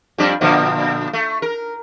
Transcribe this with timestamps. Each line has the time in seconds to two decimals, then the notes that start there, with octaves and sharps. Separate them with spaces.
0.18 F2 G3 D4
0.41 A#2 D3 F3
1.13 A3
1.42 A#4